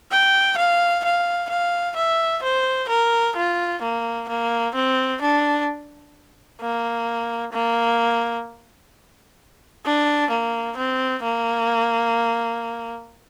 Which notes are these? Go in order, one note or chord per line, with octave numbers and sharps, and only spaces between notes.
G5
F5
F5
F5
E5
C5
A#4
F4
A#3
A#3
C4
D4
A#3
A#3
D4
A#3
C4
A#3